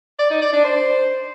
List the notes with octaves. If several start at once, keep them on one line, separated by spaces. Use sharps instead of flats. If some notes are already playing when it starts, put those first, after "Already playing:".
D5
D#4
D5
D4
C5